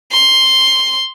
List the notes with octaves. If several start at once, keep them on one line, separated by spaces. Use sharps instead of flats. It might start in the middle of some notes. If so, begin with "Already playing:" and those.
C6